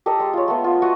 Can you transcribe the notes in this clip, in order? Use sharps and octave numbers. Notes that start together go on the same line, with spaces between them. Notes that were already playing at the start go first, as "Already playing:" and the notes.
G4 A4 A#4 D#5
G#3
F4 C#5
A3 B3
F4
F#4 D#5 C#6 D#6